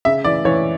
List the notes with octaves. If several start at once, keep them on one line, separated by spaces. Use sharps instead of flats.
C#3 E5
E3 D5
E3 C#5